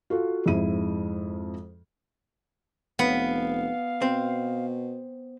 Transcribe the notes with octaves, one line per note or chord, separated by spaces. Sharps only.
F4 F#4 A4
F2 G#2 E4 D#7
F1 B3 F5
B2 C4